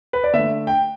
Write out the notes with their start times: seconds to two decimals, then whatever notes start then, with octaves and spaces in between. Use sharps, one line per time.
0.13 B4
0.24 D5
0.33 D3 A3 E5
0.67 G5